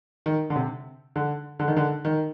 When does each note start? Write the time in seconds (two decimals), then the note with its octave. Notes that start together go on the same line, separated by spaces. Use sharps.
0.26 D#3
0.50 D3
0.56 C3
1.16 D3
1.59 D3
1.68 D#3
1.77 D3
2.05 D#3